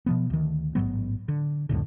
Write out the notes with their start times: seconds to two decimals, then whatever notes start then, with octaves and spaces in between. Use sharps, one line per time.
0.06 B2 F3 B3
0.30 D2 D#3
0.75 A1 G#2 F#3 B3
1.28 D3
1.69 C2 F2 A2 D3